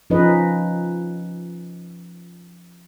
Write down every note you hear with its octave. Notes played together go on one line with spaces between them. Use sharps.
F3 C#4 D#4 B4 D#5